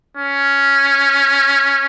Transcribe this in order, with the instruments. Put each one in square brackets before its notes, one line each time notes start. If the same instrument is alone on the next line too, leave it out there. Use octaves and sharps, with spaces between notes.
[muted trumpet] C#4